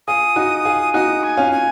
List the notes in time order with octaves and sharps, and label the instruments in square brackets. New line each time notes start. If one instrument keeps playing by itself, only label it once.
[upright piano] F4 G#4 [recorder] D#6
[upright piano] D#4 F#4
F4 G#4
[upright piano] D#4 F#4 [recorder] D#6
[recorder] G#5
[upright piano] C#4 F4
[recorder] G#5